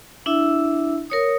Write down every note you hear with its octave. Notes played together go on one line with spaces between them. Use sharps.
D4 E4 E5 E6
A#4 C#5 D#6